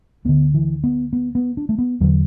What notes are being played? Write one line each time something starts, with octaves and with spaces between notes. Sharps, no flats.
D2 D3 B3
E3
B3
B3
B3
D4
A3
B3
E2 D3 F#3